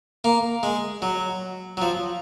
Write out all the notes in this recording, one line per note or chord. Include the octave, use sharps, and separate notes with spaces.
A#3
G#3
F#3
F#3
F3